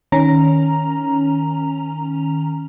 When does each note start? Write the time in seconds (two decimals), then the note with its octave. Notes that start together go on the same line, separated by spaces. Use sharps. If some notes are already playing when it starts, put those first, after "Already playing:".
0.12 D#3 C#4 A#5